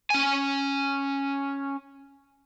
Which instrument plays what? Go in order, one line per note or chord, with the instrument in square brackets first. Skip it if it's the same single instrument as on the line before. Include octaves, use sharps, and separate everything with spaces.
[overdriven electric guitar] C#4 G#5